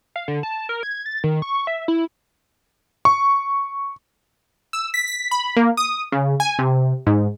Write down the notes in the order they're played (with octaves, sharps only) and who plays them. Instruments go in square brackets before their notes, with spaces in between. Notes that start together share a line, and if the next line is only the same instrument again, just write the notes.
[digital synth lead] F5
D3
A5
A#4
G#6
A6
D#3
C#6
E5
E4
[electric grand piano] C#6
[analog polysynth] E6
B6
B6
B5
A#3
D#6
C#3
G#5
C3
G#2